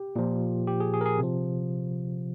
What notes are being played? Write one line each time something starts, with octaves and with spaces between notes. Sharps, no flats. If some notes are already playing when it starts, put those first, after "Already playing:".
Already playing: G4
A#2 F3
G4
G#4
G#4
A#4
G#4
C3 F3